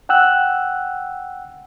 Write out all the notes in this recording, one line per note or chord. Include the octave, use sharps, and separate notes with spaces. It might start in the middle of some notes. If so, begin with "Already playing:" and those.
F#5 G5 E6 F#6